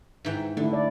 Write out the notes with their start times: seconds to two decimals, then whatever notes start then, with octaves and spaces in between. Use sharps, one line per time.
0.25 G#2 E3 G5
0.57 D3 A3 E4
0.73 D5